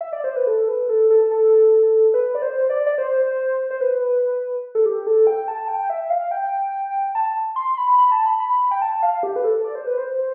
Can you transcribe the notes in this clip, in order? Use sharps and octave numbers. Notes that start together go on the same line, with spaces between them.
E5
D5
C5
B4
A4
B4
A4
A4
A4
B4
D5
C5
D5
D5
C5
C5
B4
A4
G4
A4
G5
A5
G5
E5
F5
G5
A5
C6
B5
B5
A5
B5
B5
G5
A5
F5
G4
B4
A4
D5
C5
B4
C5